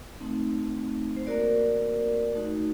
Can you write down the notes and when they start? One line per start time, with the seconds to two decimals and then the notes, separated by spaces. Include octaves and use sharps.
0.20 A3 C4 D#4
1.17 C5
1.27 A#3 F#4 A#4 D5
2.35 A3 D#4 F#4